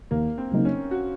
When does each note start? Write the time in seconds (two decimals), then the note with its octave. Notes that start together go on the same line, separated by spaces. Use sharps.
0.11 D#2 A#3
0.38 C4
0.51 C#3 F#3 A#3 D#4
0.65 C#4
0.91 F#4